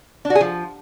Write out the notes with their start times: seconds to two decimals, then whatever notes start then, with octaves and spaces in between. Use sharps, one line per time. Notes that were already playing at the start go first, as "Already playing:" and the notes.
0.25 D4
0.30 F#4
0.35 G#4
0.41 F3